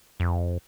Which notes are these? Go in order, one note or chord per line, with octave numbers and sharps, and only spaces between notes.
F2